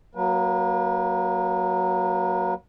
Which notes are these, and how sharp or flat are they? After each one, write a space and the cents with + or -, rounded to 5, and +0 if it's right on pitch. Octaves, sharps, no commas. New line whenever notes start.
F#3 +0 A#3 +0 B4 -40